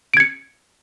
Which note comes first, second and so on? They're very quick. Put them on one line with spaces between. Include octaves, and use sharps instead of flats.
D7 G#6 C#7